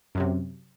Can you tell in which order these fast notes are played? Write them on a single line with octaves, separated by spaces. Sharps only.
F#2 F#3 C3